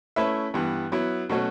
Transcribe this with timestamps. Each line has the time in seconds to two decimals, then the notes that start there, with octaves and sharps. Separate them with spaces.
0.16 A3 C#4 E4 B4 E5
0.54 G2 E3 B3
0.92 F#3 B3 E4
1.29 B2 F#3 A3 C#4 F#4